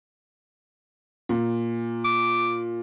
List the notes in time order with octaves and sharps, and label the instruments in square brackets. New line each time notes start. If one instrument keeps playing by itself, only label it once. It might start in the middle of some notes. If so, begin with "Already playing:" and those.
[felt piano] A#2
[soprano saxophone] D6